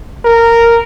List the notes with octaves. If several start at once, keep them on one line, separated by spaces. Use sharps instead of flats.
A#4